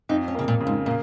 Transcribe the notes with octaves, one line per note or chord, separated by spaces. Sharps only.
F2 D#4
C#4
C#3 A#3
A#2
C#3
G#2
A#2 A#3